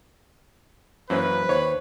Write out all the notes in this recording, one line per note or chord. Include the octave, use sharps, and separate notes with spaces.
F#2 E3 A#3 C#4 B4 C5
D#2 C5 C#5